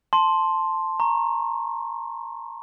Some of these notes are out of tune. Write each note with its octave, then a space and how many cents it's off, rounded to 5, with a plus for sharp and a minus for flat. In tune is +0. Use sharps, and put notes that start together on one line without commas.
A5 +0 C6 +5
A#5 +0 C#6 -25